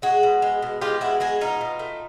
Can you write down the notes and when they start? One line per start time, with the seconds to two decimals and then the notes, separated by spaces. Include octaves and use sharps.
0.02 G#3 F#4 G#4
0.23 B2
0.42 G#3
0.62 B2
0.81 G#3 F4 G4
1.01 B2 E4 F#4
1.20 G#3 F#4 G#4
1.41 B2 D#4 F4
1.61 B2
1.79 A3